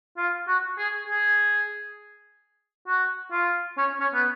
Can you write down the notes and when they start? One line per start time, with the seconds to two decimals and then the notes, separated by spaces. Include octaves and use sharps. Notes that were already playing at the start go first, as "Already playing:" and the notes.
0.17 F4
0.48 F#4
0.78 G#4
1.08 G#4
2.88 F#4
3.32 F4
3.78 C#4
4.00 C#4
4.14 B3